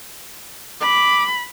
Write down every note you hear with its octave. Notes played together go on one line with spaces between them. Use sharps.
B5 D6